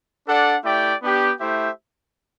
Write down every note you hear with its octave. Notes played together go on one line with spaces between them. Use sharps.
D4 A4 D5 F#5
A3 E4 G4 D5 G5
B3 D4 G4
A3 E4 G4 C5 E5